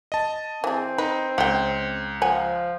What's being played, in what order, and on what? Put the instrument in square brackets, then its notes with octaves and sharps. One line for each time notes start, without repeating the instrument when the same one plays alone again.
[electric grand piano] D#5 A5
[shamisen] E3 G#4 [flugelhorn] C4
[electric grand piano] D#4 [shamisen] B4
[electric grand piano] C#2 [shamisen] F#5 G5
[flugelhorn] F3 [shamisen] F#5 G#5